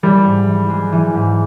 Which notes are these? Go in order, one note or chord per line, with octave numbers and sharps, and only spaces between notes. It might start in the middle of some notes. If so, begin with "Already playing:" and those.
E3 G3
G#2
E3
G#3
E3
G#2